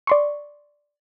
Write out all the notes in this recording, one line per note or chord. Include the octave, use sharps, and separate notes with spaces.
D5 C6 C#6